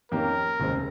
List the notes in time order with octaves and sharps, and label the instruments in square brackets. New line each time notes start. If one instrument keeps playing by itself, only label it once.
[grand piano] F2 D#3 A#3 C#4 G4 [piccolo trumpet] A#4
[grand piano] F1 D#2 C#3 G#3 C4